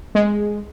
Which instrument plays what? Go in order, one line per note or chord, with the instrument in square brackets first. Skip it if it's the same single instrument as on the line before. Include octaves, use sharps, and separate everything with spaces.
[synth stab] G#3